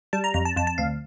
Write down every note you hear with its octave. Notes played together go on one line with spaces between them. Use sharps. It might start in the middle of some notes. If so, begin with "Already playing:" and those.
G3 A5
A#5
F2 A#5
A5
F2 A5
A5
D2 F5